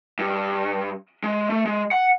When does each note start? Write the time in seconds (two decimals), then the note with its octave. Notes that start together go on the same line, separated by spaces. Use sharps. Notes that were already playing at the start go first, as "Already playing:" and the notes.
0.19 G2
1.23 G#3
1.50 A3
1.65 G#3
1.91 F#5